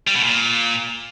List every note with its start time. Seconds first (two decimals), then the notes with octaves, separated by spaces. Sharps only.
0.07 G3
0.16 B2
0.24 A#2